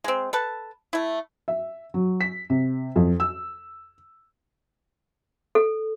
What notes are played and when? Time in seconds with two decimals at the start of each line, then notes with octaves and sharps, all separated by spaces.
0.04 G#3 C4
0.33 A4 B4 A5
0.93 A3 E4
1.48 E5
1.94 F#3
2.21 B6
2.50 C3
2.96 F2
3.20 E6
5.55 A4